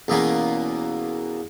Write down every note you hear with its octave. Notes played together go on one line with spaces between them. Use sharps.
E2 B2 A#3 C#4